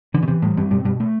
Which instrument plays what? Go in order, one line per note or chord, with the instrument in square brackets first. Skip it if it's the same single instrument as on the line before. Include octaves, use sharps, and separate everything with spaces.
[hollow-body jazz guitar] D3 [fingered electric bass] E3
[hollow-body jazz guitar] B2
[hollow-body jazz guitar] C3 [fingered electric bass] E3
[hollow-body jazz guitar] A2 [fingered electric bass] G3
[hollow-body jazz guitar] G2 [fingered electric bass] C4
[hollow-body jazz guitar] G2 [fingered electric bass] B2
[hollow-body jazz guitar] G2 [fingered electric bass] B2
[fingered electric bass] A3